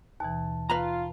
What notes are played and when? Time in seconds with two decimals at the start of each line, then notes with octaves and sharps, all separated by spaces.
0.20 D#2 B2 E3 A5
0.70 F4 B4 F5 A#5